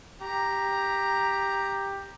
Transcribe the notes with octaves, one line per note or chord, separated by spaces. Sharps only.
G4 A#5